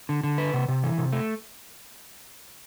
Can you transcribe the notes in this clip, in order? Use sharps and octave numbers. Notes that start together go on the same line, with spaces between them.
D3
D3
B4
C3
C3
E3
C3
A3